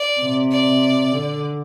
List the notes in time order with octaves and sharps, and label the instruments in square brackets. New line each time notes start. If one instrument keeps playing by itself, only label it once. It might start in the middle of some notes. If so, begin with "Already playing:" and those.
Already playing: [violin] D5
[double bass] C3
[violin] D5
[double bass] D3